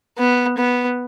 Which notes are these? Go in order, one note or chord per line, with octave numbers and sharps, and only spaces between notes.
B3
B3